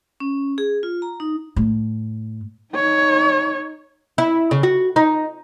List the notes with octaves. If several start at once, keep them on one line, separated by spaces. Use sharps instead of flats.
C#4
G#4
F4
A#5
D#4
A2
D#4 C#5
E4
C#3
F#4
D#4